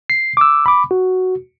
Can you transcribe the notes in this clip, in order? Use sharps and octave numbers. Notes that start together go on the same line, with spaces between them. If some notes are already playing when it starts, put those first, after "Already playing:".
C7
D6 E6
B5 D6
F#4